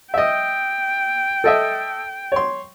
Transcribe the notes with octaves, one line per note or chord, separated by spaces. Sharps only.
D#5 E5 G5
A4 D#5 E5
C#5 C6